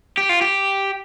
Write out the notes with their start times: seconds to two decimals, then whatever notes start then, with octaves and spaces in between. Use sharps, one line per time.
0.17 G4
0.29 F4
0.41 G4